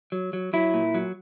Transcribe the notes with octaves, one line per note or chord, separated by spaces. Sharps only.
F#3
F#3
F#3 E4
A#2
F#3